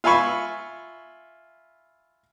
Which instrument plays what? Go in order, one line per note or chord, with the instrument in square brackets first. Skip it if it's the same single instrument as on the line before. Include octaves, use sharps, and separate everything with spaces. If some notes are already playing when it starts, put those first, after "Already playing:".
[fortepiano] F4 E5 G#5 B5 C#6